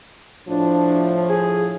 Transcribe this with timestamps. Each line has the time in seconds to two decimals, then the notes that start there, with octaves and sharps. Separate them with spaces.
0.48 A2 F3 D4
1.30 G#4